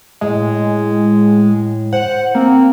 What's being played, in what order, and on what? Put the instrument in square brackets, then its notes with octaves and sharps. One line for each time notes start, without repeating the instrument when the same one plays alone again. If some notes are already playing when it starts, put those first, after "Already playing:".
[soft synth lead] A2 [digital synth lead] G#3
[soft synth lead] C5 [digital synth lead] F#5
[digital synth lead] A#3 [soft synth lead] C4